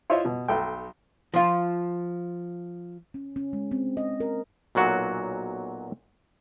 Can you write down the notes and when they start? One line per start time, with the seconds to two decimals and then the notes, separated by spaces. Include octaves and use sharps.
0.10 E4 F4 C5 C#5 D#5 E5
0.25 B2
0.48 B1 A4 G5
1.34 F3 F4
3.14 C#4
3.36 C#4
3.53 G#3
3.71 C4
3.97 D#5
4.20 A#4
4.75 B1 A#2 F#3 F#4